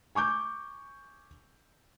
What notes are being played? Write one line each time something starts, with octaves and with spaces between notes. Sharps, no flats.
G#5 C#6 D6 G6